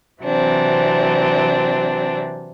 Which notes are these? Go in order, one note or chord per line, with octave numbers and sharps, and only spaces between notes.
C3 E3 F#3 C4 D4